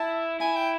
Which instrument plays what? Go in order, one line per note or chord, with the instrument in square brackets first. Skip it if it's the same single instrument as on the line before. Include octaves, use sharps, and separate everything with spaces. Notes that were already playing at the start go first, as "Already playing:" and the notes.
Already playing: [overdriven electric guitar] E4 [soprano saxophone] A5
[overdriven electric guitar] E4 [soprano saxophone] G#5
[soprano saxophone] G5